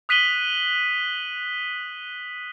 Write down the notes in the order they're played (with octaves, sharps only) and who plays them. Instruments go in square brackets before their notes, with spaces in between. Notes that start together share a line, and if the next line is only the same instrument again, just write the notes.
[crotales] D#6 F#6 B6 D#7 F#7 G7